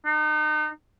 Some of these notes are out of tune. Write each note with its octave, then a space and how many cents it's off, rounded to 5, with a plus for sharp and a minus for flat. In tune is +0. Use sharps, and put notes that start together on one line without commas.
D#4 -35